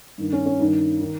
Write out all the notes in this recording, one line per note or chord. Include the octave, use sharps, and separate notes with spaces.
G2 D#3
C#4
C#4
G2 D#3 D#4
D#3